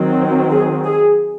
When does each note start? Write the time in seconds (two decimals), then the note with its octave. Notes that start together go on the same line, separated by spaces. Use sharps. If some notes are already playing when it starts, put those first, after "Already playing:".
Already playing: D#3 F#3 C4
0.50 G#4
0.85 G#4